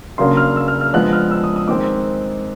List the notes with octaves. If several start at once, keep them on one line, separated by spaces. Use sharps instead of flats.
C#3 F#3 A#3 D4 C6
F6
E6
F6
F6
F3 G#3 B3 D4 F#6
F6
E6
D#6
D#6
D#3 G#3 C4 D6